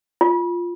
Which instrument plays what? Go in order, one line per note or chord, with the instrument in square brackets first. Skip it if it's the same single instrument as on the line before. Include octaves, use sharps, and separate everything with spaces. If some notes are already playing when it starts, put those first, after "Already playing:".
[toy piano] F4